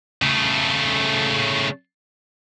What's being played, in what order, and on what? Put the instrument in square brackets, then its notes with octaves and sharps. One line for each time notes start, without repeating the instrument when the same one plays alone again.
[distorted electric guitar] C#3 A3